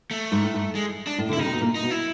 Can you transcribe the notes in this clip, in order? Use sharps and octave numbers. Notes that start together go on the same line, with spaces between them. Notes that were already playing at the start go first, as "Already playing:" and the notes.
A3
G#2
A2
G#2
G#3
D4
A2
D3
E4
C#3 D#4
C3
B2
A#2
D#4
B2
E4